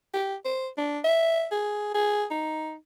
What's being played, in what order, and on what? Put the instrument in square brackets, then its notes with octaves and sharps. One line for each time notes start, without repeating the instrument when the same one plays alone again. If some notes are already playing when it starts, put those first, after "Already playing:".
[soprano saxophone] G4
C5
D4
E5
G#4
G#4
D#4